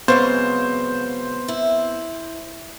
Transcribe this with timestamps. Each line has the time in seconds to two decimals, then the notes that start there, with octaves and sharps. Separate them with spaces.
0.08 C#3 F#3 G#3 B3 C4 B4 C5
1.48 E4